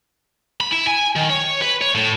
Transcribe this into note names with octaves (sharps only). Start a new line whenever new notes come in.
B5
E4
G#5
D#3
C#5
B4
C#5
A2